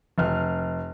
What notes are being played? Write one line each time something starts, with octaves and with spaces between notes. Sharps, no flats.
F1 F6